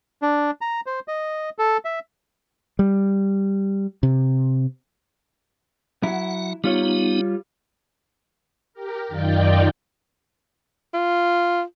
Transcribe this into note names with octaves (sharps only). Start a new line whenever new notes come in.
D4
A#5
C5
D#5
A4
E5
G3
C3
F#3 E4 F#5
G3 B3 D#4 F4 C#5
G4 A#4
F#2 D#3 D#4 F4 D5 G5
F4